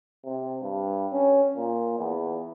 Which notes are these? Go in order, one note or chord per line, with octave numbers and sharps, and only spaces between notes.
C3
G2
C#4
A#2
E2